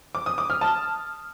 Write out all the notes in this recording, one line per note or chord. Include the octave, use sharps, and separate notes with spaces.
D6
D#6
D6
F6
A5